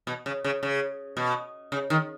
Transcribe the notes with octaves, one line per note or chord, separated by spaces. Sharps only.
B2
C#3
C#3
C#3
B2
C#3
D#3